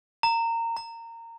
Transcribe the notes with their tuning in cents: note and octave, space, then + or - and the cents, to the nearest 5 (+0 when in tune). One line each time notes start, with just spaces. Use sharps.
A#5 -20
A#5 -20